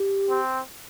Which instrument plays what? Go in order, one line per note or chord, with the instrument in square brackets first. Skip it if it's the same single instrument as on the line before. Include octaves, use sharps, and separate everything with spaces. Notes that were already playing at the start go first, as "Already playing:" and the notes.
Already playing: [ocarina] G4
[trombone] C4